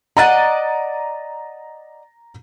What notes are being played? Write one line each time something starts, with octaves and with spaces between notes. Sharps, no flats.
D5 D#5 F#5 A#5 A6 D#7